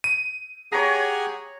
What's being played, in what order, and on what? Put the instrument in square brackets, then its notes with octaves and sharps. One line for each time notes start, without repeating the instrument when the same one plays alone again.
[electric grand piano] D#7
[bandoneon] G4 F#5 G#5 [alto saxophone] G#4 [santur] C#5 A#5